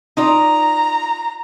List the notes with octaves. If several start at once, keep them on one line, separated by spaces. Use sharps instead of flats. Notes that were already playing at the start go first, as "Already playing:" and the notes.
D#4 F4 D5 A#5